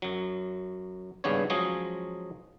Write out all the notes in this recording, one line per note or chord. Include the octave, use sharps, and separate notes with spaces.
F#2 F#3
G#1 G2 C#3 B3 D4 C#5
F3 F#3 G#3 C#4 G#4 D#5